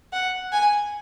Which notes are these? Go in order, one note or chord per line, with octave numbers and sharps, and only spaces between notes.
F#5
G#5